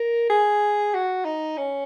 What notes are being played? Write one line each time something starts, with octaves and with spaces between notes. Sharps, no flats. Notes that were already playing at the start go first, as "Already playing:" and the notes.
Already playing: A#4
G#4
F#4
D#4
C#4